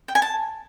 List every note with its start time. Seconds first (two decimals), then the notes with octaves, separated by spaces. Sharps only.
0.08 G5
0.15 G#5
0.22 A5